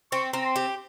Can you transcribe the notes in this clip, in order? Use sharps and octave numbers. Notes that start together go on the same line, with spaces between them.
C4 C#6
C4 A#5
C6
G4